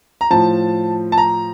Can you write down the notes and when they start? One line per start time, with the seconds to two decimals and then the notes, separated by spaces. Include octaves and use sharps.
0.21 A#5
0.30 A2 F3 A5
1.12 A5
1.18 A#5